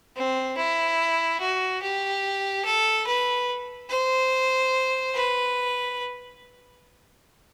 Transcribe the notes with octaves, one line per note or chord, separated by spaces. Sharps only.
C4
E4
F#4
G4
A4
B4
C5
B4